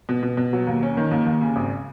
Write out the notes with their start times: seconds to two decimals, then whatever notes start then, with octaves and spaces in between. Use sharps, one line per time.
0.09 B2
0.23 B2
0.37 B2
0.53 F#3
0.67 D#2
0.83 C#4
0.97 D#3
1.11 D#2
1.26 D#2
1.41 C#3
1.56 G#1